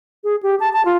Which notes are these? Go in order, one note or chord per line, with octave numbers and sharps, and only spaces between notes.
G#4
G4
A5
A5
F4